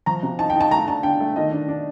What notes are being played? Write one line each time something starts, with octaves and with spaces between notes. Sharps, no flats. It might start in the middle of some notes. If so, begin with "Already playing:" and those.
F3 A#5
C3
D#4 A5
G5
D#4 A5
A3 A#5
D4 A5
D3 G5
A3
D#3 D#5
D4
D4